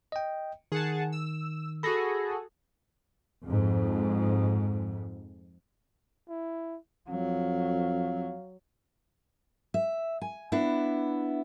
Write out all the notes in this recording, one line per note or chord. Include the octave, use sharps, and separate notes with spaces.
D#5 G5
D#3 G#4 F#5 A5
E6
F#4 G#4 A4 B5 A#6
F2 G#2
E4
F2 F#3 F5
E5
G#5
B3 D4 E4